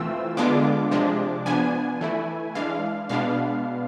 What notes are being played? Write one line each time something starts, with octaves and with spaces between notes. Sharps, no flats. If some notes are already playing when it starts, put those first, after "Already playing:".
Already playing: E3 A3 C4 F4 E6
D3 G#3 B3 D4 F4 D6
C3 F3 G#3 D4
F3 B3 D4 G#5
E3 A3 E4
E3 G#3 D4 F5
B2 G#3 B3 D4 F5